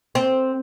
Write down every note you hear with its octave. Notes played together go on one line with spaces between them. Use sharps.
C4